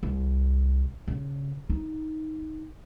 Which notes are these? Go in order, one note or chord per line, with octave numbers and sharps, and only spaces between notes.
C2
C#3
D#4